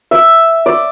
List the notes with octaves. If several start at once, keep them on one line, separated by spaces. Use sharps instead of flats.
E5
D5